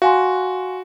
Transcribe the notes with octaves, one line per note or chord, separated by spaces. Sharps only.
F#4 F5 G#5 C6